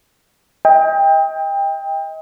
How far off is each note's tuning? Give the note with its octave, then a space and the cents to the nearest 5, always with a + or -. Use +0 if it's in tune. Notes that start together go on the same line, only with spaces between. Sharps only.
D#5 +35 G5 +25